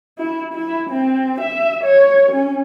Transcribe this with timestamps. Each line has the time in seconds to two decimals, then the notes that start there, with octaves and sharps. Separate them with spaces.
0.18 E4
0.54 E4
0.90 C4
1.41 E5
1.84 C#5
2.32 C#4